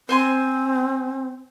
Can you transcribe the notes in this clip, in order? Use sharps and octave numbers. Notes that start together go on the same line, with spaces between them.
C4 C5 G#5 C6